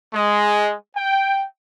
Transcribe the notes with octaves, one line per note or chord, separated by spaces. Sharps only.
G#3
G5